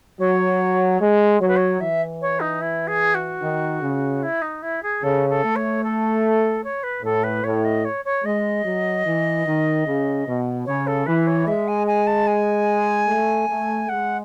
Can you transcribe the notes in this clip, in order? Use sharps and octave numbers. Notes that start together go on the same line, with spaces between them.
F#3 C#5
G#3
F#3 C#5
B4
C#5
E3 E5
C#5
D#4
E4
G#4
F#4
D#3
C#3
E4
D#4
E4
G#4
C#3 A4
A4
A3
C#5
A4
C#5
B4
A2 A4
B4
A2 C#5
D#5
C#5
C#5
G#3 D#5
F#3
E3
D#3
C#3
B2
C#3 C#5
A4
E3 B4
C#5
G#3 E5
G#5
G#5
A5
G#5
A3
A3
G#3 F#5